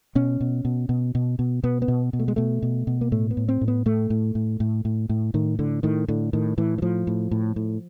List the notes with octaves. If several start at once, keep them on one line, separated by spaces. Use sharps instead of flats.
B2 C#4
B2
B2
B2
B2
B2
B2 B3
B3
B2
B2
A3
G#3
B2 A3
B2
B2
A#3
A2 A3
B3
A2
C4
A2
B3
A2 A3
A2
A2
A2
A2
A2
A2 D#3
A2 D3
A2 D#3
A2 D3
A2 D#3
A2 E3
E3
A2 F3
A2
A2
A2